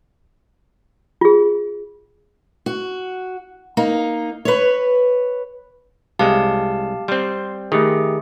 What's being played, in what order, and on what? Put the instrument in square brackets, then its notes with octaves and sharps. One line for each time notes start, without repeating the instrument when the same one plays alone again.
[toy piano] F4 G#4
[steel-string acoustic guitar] F#4
A#3 D#4
B4 C#5
[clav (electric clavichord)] C2 G#3 [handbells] G4 F5 A5
[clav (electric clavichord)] G3 C4 [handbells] C6
[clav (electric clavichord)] D#3 [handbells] A3 G4 G#4